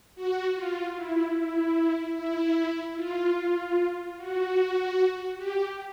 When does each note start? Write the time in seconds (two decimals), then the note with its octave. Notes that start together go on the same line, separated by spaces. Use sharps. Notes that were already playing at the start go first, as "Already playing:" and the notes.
0.16 F#4
0.55 F4
0.96 E4
1.36 E4
2.16 E4
2.97 F4
4.17 F#4
5.38 G4